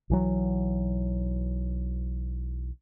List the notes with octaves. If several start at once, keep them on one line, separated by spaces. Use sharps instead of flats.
B1 E3 F#3